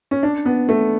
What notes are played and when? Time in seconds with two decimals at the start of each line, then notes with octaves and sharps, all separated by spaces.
0.11 C#4
0.23 D4
0.45 B3
0.69 A3